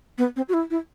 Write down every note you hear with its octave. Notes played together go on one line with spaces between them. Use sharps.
B3
C4
F#4
E4
E4